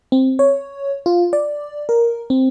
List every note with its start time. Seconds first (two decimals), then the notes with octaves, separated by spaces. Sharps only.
0.12 C4
0.39 C#5
1.06 F4
1.33 D5
1.89 A#4
2.30 C4